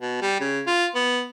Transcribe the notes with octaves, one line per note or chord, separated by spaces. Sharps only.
B2
G3
C#3
F4
B3